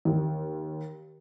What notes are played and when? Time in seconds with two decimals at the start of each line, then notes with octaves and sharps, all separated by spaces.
0.05 D#2